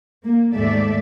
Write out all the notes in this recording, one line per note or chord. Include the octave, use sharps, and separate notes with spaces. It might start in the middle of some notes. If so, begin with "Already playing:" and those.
A#3
D#2 G#2 A3 A4 D5 E5